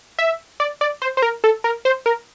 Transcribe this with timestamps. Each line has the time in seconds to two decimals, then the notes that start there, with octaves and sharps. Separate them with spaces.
0.19 E5
0.60 D5
0.81 D5
1.02 C5
1.17 C5
1.22 A#4
1.44 A4
1.64 A#4
1.85 C5
2.06 A#4